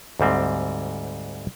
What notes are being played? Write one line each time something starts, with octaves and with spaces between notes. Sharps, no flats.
D2 G#2 G3 C4